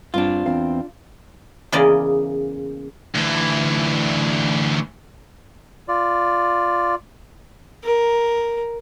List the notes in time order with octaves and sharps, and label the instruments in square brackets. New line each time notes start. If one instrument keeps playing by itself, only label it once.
[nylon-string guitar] G2 C4 [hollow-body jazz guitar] D4 F4
[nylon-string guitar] E2 C4 F5
[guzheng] E2 C#3 A#3 D5 D#5
[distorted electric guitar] D2 E3
[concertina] F4 D5
[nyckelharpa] A#4